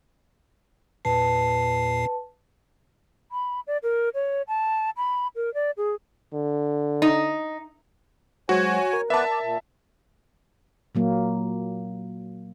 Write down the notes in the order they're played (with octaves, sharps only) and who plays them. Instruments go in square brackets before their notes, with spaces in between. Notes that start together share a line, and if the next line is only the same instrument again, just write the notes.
[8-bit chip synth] E2 A#2 C7 [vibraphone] B4 A5
[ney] B5
D5
A#4
C#5
A5
B5
A#4
D5
G#4
[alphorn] D3
[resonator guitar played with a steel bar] D#4
[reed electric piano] F#3 G#3 C5 [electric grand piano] F#4 [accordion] C#5 G#5
[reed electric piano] A#4
[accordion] B3 B4 D5 [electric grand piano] E5 A5
[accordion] D5
A#2
[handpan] A#2 F#3 A#3